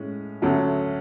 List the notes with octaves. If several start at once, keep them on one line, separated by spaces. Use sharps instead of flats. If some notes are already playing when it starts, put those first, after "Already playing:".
Already playing: A2 G#3 C#4
D2 C#3 F#3 A3